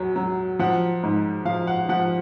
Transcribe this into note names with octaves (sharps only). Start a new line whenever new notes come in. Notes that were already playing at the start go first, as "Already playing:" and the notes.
Already playing: E2 F#3
F#3
F3 F#5
G#2
F3 F5
F#5
F3 F#5